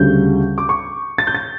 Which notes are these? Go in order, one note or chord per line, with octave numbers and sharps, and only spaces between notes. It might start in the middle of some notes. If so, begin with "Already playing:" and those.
Already playing: D2 C#3 G3 G6
D6
C#6
A6
G6
A6